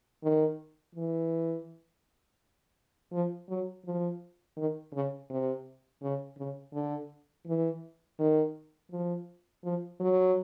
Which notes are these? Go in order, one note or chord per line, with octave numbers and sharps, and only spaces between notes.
D#3
E3
F3
F#3
F3
D#3
C#3
C3
C#3
C#3
D3
E3
D#3
F3
F3
F#3